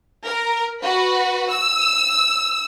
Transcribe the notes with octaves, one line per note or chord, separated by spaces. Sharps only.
A#4
F#4 B4
E6